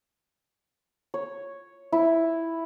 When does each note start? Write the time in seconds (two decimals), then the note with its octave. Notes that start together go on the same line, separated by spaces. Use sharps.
1.14 C#5
1.92 E4